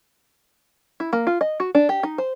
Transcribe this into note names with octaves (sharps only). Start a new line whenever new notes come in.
E4
A#3
F4
D#5
F#4
D4
G4
D#4
C5